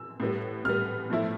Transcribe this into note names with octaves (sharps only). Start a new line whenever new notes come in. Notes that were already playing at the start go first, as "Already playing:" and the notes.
Already playing: E6
A2 G3 B3
A2 G3 B3 F6
A2 F3 A3 E4